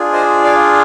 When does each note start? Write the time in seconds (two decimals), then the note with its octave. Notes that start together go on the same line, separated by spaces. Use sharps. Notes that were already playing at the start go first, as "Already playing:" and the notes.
Already playing: D4 F4 G#4
0.13 C5 D#5
0.44 D5 F5